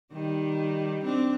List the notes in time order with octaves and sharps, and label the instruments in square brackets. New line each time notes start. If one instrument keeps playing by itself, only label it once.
[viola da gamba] D#3 G3
C4 D4